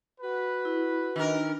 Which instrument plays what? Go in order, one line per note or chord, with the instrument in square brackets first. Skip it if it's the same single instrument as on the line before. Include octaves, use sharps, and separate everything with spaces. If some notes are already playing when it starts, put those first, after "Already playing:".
[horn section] F#4 B4
[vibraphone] E4
[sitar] D#3 A#4 [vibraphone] D4